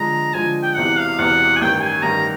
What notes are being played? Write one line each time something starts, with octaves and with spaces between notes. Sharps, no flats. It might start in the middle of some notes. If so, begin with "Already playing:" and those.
Already playing: D3 F3 G#3 A#5
D3 F3 G#3 G#5
G5
E1 E2 C3 E3 F#5
F5
E1 E2 C3 E3 F#5
G#5
A1 G2 D#3 G5
G#5
A1 G2 D#3 A#5